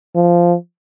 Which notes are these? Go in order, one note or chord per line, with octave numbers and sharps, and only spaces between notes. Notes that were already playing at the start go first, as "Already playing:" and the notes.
F3